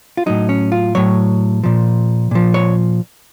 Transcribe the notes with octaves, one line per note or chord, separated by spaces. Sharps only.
F4
A2 F#3 D#4
C#4
F4
A2 F#3 C#5
A#2 F3
A#2 F3
C#5